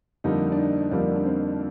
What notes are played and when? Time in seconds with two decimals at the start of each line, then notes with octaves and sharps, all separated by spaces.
0.24 F2 D3 G3 A#3 D#4
0.52 D4
0.58 D#4
0.91 F2 D3 G3 A#3 D4
1.16 D4
1.25 C4